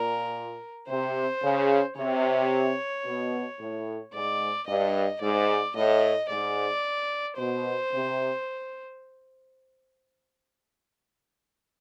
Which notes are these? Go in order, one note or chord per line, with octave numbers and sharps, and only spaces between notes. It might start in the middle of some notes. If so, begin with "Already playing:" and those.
Already playing: A#2 A#4
C3 C5
C#3
C3 C#5
B2
A2
G#2 D5
G2 D#5
G#2 D5
A2 D#5
G#2 D5
B2 C5
C3